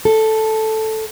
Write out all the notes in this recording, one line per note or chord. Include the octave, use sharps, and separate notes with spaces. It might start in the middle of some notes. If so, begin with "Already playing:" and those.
A4